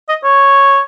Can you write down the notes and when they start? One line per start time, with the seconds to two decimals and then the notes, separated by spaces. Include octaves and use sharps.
0.09 D#5
0.24 C#5